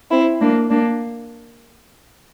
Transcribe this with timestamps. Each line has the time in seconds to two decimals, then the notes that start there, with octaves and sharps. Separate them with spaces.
0.10 C4 E4
0.41 A#3 D4
0.70 A#3 D4